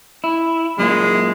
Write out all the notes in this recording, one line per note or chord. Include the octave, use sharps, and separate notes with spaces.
E4
F#2 A#2 G#3 A#3